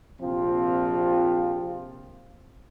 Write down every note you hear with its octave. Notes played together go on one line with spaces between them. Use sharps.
A#1 C3 F3 C4 F4